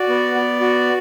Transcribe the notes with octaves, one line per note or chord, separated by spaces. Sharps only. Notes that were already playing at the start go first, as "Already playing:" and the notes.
Already playing: F#4 D5
B3
B3
F#4